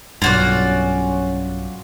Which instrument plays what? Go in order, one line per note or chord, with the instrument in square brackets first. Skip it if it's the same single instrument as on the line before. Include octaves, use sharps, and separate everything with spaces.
[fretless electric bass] B1 G2 [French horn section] C#4 [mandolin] F4 F#4 D5